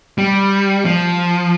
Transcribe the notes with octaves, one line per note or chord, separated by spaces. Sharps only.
G3
F3